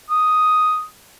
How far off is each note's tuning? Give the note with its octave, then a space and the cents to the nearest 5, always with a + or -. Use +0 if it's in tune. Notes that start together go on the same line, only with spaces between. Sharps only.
D#6 +0